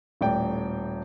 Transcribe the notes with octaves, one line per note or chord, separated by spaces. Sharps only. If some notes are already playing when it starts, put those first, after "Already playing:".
D#1 A2 D5 G5